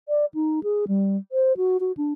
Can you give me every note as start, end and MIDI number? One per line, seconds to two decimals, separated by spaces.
0.09 0.25 74
0.34 0.60 63
0.63 0.85 68
0.88 1.17 55
1.32 1.56 72
1.57 1.77 66
1.80 1.92 66
1.97 2.13 62